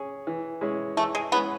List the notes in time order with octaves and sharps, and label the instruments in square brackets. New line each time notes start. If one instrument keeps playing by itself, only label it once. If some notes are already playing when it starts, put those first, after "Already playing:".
Already playing: [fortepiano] C#4 G#4
E3
G#3 C#4 E4 G#4
[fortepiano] E3 [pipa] A3
[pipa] G#3
[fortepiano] G#3 C#4 E4 G#4 [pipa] B3